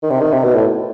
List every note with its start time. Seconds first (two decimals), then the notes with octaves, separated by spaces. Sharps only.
0.03 D#3
0.10 C3
0.21 D#3
0.33 C3
0.44 B2
0.54 A2